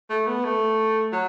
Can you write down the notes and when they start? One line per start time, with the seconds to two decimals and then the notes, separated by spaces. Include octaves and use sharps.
0.10 A3
0.26 B3
0.44 A3
1.12 F#3